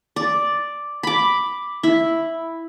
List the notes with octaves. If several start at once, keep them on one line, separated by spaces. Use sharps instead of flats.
D5
B5 D6
E4